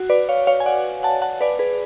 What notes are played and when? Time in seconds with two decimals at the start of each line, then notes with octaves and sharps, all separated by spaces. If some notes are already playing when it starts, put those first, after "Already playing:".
Already playing: F#4
0.10 B4 D5
0.29 C#5 F5
0.47 C#5 F5
0.60 G#5
0.66 D5 F#5
1.03 F#5 A5
1.22 F#5 A5
1.41 B4 D5
1.59 G#4 B4